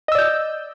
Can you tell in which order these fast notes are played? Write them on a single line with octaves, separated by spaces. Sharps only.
D#5 E6 D5 G6